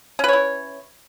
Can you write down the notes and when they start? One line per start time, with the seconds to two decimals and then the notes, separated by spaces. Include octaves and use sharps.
0.19 C#4
0.24 B4
0.28 C#5
0.33 E4